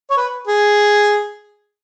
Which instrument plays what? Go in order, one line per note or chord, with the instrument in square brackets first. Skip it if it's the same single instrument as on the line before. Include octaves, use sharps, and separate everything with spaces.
[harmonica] C#5
B4
G#4